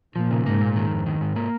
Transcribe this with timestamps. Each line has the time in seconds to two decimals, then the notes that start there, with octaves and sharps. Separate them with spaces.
0.16 A#2 F3
0.31 C#3
0.46 G#2 A#3
0.61 A#2
0.76 D#3
0.91 F2
1.06 D#3
1.21 G#2
1.36 A#3